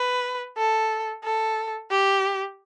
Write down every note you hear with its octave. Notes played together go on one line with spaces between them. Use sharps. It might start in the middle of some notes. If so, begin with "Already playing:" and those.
Already playing: B4
A4
A4
G4